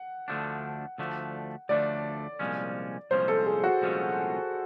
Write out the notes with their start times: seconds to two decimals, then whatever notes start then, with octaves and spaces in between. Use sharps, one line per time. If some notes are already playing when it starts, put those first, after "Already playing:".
Already playing: F#5
0.28 D2 D3 F3 A3 D4
0.98 D2 D3 F3 A3 D4
1.69 D2 D3 F3 A3 D4 D5
2.39 C2 A#2 F3 G#3 C#4
3.11 C2 A#2 F3 G#3 C#4 C5
3.28 A4
3.46 G#4
3.63 F#4
3.81 C2 A#2 F3 G#3 C#4